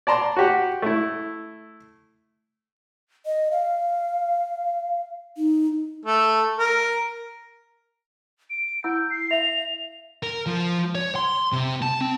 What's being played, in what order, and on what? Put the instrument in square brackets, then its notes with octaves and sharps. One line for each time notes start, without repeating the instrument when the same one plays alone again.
[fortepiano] D5 A5 A#5 C6
F#4 G4 F#5
A3 E4
[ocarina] D#5
F5
D#4
[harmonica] A3
A#4
[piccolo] D7
[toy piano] E4 F#5 E6 [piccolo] G6
[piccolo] C7
[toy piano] E5 F5 [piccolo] F7
[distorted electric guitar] A#4
F3
C#5
C6
C3
A5
C4